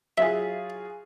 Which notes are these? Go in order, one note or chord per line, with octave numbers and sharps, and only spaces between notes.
F#3 F4 G#4 E5